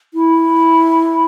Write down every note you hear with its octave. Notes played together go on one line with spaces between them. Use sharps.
E4